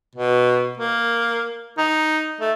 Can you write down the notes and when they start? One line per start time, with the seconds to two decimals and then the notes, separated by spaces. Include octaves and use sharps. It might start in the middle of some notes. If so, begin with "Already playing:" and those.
0.16 B2
0.78 A#3
1.78 D#4
2.41 A3